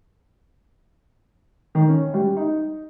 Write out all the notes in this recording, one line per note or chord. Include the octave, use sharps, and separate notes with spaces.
D#3
C#4
G3
D#4